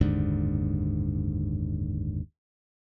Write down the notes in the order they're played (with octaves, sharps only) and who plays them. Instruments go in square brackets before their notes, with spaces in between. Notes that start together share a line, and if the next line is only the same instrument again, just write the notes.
[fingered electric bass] F#1 D#2 G#2 D3